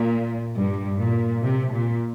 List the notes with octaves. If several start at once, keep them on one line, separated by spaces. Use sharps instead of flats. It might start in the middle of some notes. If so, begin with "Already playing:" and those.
Already playing: A#2
G2
A#2
C3
A#2